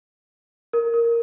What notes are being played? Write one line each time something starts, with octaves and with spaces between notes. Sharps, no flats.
A#4
A#4